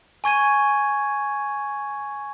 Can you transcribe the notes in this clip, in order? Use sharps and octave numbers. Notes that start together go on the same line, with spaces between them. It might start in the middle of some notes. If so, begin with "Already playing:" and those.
G#5 C#6 G#6 D#7